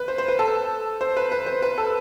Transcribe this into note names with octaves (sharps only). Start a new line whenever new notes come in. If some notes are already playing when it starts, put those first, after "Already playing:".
Already playing: B4
C5
C5
B4
A4
C5
B4
B4
C5
B4
A4